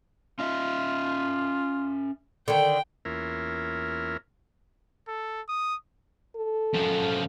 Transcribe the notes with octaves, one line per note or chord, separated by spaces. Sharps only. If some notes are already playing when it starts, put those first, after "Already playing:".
C#4 F4 D#5 E5
D3 D#3 G5
E2 A#3 C#4 F4 A#4 E5
A4
D#6
A4
F#2 F3